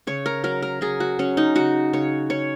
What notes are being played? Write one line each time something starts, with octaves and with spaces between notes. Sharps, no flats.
C#3 C#5
A#4
F#3 A#4
A#4
F#3 G#4
F#4
F#3 C#4
D#4
C#3 F#4
C#3 C#5
C#4 C#5